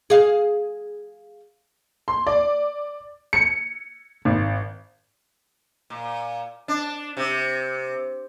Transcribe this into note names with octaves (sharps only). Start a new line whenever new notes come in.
G#4 F5
C6
D5
C#7
G#1
A#2
D4
C3